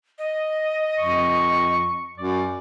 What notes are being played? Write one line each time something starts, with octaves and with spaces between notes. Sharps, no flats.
D#5
F2 C#6
F#2 D5